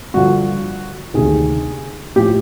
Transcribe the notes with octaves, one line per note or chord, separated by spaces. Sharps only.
G2 D3 F3 F#4
D2 C3 D#3 G#4
A2 F3 G4